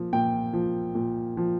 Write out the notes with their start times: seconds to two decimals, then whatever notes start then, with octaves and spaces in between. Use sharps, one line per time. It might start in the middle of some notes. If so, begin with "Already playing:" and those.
Already playing: A#2 F3
0.13 A#2 G5
0.54 F3
0.95 A#2
1.37 F3